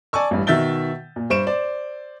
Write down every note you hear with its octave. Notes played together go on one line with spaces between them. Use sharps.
D5 G#5 A5 C#6 E6
A1 G2
B2 D#3 E5 G6 A6 G7
A#2
G2 C5 C#6 D7 E7
C5 D5